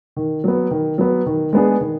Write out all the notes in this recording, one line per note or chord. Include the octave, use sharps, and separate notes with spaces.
D#3
F#3 B3
D#3
F#3 B3
D#3
G#3 B3 D4 G#4
D#3